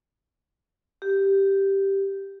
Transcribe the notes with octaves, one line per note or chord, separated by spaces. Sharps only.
G4